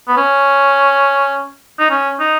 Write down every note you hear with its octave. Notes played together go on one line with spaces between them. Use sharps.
B3
C#4
D#4
C#4
D#4